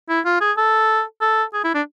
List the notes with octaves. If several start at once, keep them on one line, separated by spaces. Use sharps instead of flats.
E4
F4
G#4
A4
A4
G#4
E4
D4